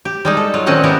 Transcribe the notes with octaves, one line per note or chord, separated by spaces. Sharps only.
G4
G3 G#3 D#4
A4
F#3 F4
A#2 D#3 C4 C#4 D#5 F#5
G#3 B3 E4 G4 A#4